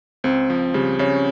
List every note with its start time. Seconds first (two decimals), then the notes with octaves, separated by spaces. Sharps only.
0.24 C#2 C4
0.50 F3
0.74 C#3 G3
0.99 C#3 C#4